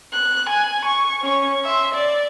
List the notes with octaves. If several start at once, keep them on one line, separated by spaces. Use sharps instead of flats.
F#6
G#5
C#6
C#4 C#6
E5 C6
D5